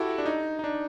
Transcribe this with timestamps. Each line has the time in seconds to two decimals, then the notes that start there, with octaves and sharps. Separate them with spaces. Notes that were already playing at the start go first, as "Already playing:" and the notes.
Already playing: E4 F#4 G4 A4
0.18 D4
0.26 D#4
0.59 D#4
0.64 D4